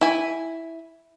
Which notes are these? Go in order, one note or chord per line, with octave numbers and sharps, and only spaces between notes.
E4 G#5